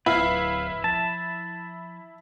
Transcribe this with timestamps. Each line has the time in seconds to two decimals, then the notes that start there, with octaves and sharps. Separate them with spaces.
0.06 D1 D2 E4 B4 F5
0.84 F3 A5